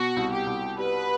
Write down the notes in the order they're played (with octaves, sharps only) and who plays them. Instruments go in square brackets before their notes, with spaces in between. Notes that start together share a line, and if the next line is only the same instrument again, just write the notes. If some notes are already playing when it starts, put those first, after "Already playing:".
Already playing: [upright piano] B2 [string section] F#4
[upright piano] C2
[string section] G4
[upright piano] C2
[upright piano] G3 [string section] B4